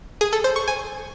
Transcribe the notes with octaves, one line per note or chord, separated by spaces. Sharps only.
G#4
A4
C5
C#6
G#5